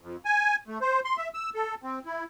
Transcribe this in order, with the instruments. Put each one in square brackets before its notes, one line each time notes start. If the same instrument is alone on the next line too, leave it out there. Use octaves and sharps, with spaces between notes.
[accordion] F2
G#5
A3
C5
C6
E5
E6
A4
C4
E4